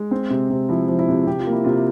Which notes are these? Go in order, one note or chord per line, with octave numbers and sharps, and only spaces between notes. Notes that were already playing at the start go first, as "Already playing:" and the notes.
Already playing: G#3
C4
C3
C3
F3 E4
F3
E4
C3
C3 G4
F4
A#3
E4
C3 F4